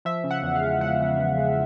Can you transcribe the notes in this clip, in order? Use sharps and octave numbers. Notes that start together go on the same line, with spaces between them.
F3 E5
C#3
F#5
E2
F5
G#3
F3 F#5
C#3
E2
G#3